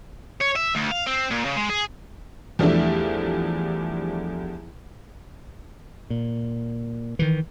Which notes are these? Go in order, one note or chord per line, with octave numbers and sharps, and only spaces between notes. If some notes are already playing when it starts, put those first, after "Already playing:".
C#5
E5
D2
F5
C4
A#2
C#3
G#3
G#4
E2 F3 G3 A3 D4 E5
A#2
D#3 E3